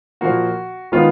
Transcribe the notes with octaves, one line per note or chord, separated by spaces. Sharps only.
A#2 F3 A#3 F#4
D#3 G#3 B3 F4